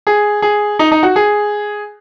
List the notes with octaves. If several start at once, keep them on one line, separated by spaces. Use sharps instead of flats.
G#4
G#4
D#4
D#4
F#4
G#4